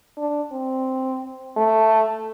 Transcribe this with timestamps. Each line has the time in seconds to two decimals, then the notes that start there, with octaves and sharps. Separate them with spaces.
0.17 D4
0.52 C4
1.57 A3